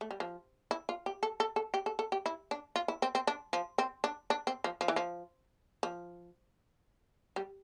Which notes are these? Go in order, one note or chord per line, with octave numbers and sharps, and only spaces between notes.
A3
G3
F3
E4
F4
G4
A4
A4
A4
G4
A4
A4
G4
E4
D4
F4
E4
C4
C4
D4
F3
C4
D4
D4
C4
F3
F3
E3
F3
F3
G3